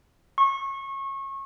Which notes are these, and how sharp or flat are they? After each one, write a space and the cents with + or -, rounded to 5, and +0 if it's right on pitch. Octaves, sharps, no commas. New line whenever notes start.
C#6 -25